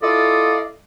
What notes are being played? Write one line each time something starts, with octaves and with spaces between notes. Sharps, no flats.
E4 F4 A4 D5 D#5 F5